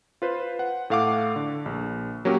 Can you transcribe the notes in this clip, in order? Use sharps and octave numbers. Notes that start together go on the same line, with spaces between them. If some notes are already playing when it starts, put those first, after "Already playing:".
F4 B4 C5
F#5
A2 A3 F5 F#5 D6
D3
A#1
F#3 A#3 C#4 F#4 G4